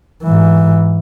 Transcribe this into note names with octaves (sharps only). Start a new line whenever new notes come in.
G#2 E3